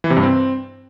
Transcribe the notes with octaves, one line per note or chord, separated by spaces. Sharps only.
E3
C3
G2
C4